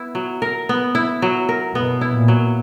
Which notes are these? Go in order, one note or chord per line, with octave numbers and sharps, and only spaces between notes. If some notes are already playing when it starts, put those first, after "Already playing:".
Already playing: B3 E4
F#3
A#4
B3
E4
F#3
A#4
B2 B3
E4
A#2
F#3